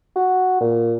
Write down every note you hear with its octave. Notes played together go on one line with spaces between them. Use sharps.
F#4
A#2